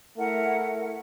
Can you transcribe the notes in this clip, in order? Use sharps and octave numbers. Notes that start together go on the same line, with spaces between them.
A3 E4 A#4 F#5